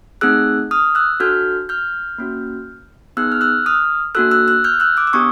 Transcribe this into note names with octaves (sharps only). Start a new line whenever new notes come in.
A3 C4 D#4 G#4 E6 F#6
D#6 F6
E6 F#6
D4 F#4 A4 F6 G6
F6 G6
A#3 C#4 F#4
B3 D#4 G#4 E6 F#6
F6
E6 F#6
D#6 F6
A#3 D4 F#4 A4 E6 F#6
E6 F#6
E6 F#6
F6 G6
E6 F#6
D6 E6
E6
B3 D4 G4 C#6 D#6